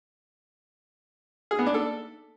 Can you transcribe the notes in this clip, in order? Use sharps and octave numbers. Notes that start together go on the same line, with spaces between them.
G#4
B3
D4
A4